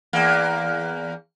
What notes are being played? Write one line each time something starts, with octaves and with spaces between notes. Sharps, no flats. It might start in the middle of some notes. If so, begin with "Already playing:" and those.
E2 A#3